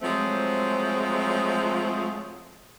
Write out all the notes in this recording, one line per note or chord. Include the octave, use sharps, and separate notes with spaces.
F3 F#3 G#3 A3 C4